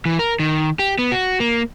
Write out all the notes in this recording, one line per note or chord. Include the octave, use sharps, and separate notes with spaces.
E3
A#4
D#3
G4
B3
F#4
A#3